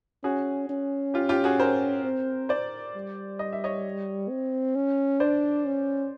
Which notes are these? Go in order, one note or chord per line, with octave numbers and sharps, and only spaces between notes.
C#4 F#4 G#4
C#4
F4 G4
F4 G4
F#4 G#4
A#4 C5
C4
C5 D5
G3
D#5
E5
C#5 D#5
C4
C#4
D4 C5 D5
C#4